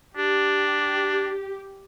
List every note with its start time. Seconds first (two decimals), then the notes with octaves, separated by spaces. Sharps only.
0.17 D4 G4